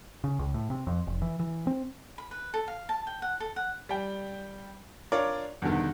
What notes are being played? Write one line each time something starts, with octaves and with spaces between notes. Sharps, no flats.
C#3
C#2
A2
C3
F2
F1
E3
E3
C4
B5
B4
A4
F5
A5
G5
F#5
A4
F#5
G3 G5
D4 F4 A#4 C#5 D5
E2 G2 B2 D3 D#3